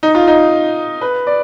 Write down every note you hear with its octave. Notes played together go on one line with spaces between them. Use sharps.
D#4
F4
D#4
B4
D5